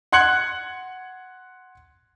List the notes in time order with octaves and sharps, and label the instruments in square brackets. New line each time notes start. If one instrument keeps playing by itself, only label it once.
[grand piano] F#5 C6 F#6 G#6 C#7 F#7